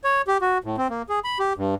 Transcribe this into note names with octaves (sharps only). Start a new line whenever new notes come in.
C#5
G4
F#4
A2
C4
A#3
G#4
B5
G4
G2